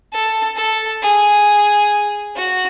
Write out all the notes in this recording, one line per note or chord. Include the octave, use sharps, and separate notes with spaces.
A4
A4
G#4
F#4